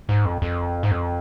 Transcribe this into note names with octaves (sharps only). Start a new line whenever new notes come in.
G#2
F2
F2
G#2
F2